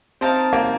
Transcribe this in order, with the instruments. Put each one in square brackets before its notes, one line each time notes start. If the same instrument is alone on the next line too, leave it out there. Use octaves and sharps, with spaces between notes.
[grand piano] C4 [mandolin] D#4 A#4 F5 A5
[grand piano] A#3